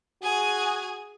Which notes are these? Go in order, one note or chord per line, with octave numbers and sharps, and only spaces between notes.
F#4 G#4 G#5